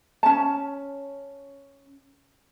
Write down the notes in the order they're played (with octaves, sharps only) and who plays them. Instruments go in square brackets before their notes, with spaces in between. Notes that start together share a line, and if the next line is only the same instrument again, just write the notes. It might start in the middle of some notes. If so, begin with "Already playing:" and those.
[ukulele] C#4 A5